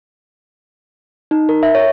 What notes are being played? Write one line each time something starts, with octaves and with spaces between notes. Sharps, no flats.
D#4
A#4
E5
C#5